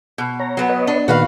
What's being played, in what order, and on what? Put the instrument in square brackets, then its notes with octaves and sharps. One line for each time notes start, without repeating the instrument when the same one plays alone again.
[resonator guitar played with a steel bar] B2
[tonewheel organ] C#5 A#5
[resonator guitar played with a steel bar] F#3 B3
[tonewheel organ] B4 C#5 D#5
[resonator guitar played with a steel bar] D4
[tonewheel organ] A#2 D#3 [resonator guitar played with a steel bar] F#4 B4 F5